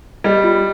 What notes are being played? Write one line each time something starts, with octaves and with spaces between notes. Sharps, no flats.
G3 D#5
F4